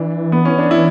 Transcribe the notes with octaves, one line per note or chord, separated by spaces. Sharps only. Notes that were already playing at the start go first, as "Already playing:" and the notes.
Already playing: E3 D4
B3
C#4
D4
E4